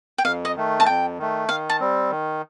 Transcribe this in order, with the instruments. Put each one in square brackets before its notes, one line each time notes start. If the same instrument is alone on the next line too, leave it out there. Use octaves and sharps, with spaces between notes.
[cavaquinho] G5
[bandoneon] F2 [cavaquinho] F5
[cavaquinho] D#5
[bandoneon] D#3 A3
[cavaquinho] A5
[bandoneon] F2 [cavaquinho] G5
[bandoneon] D#3 A3
[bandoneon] D#3 [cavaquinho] F5
[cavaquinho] A5
[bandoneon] G3 C4
D#3